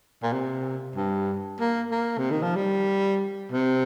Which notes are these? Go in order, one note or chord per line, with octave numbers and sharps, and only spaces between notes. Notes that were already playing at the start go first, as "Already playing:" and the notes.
A#2
C3
G2
A#3
A#3
C3
D#3
F3
G3
C3